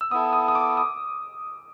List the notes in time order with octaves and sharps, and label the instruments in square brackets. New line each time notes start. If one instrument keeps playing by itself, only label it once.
[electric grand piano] E6
[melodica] B3 E4 A4 [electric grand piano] D#6
[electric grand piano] D#6
D#6
D6
D#6